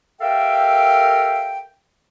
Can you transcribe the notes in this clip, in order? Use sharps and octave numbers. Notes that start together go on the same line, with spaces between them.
G4 A4 A#4 E5 F5 G5